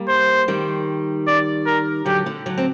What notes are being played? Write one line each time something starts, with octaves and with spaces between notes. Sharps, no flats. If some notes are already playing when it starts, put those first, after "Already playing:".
Already playing: G3 A#3
C5
D#3 G3
D5
A#4
D3 F#3 G4
D3
D3 F#3
C4